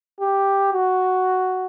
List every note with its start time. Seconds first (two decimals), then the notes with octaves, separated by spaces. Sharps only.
0.20 G4
0.73 F#4